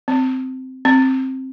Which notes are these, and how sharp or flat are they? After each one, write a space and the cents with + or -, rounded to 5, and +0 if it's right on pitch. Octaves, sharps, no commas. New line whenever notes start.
C4 -10
C4 +10